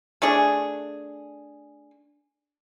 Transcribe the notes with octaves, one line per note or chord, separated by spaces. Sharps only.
A3 D4 G#4